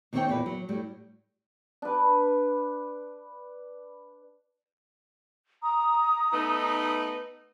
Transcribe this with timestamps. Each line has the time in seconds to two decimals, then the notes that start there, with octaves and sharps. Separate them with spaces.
0.13 D#2 D#3 C4 A4 C#5 G5
0.28 E2 A#2 A#3 E4 B4
0.46 F#3
0.69 A2 F#3 G3
1.82 D4 B4
5.63 A#5 D#6
6.33 A3 B3 D#4